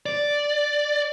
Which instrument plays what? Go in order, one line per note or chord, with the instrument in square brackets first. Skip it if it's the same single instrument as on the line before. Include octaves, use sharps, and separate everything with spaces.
[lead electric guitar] D5